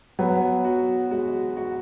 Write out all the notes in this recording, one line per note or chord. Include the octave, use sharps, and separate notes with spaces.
F#3 B3
F#4
G#3 F#4
F#4